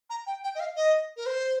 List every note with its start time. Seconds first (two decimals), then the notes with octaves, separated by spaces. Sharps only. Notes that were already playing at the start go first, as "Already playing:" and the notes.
0.10 A#5
0.27 G5
0.44 G5
0.55 D#5
0.60 F5
0.76 D#5
1.17 A#4
1.26 C5